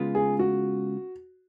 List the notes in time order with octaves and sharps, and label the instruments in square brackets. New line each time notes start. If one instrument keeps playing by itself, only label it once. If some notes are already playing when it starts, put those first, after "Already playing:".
Already playing: [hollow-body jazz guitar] C#3 G#3 B3 F4
[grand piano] G#4
F#4